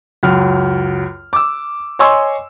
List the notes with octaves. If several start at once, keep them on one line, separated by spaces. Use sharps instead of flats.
C#2 F#2 F6
D6 E6
C#5 D#5 G#5 C6 C#6 E6